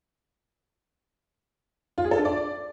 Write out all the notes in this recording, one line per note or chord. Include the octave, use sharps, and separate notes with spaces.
F4
G#4
A4
D4
D5